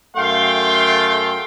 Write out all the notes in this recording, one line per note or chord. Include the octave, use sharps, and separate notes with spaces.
F#2 A3 F5 G5 C6